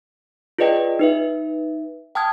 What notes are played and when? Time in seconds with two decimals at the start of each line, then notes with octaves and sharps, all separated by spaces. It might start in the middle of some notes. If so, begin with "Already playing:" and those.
0.58 F4 G#4 B4 D5 D#5 G5
0.99 D#4 B4 E5
2.15 G5 A5 D#6 F6 G#6